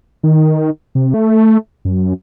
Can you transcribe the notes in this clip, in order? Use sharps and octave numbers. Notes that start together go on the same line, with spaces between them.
D#3
C3
A3
F#2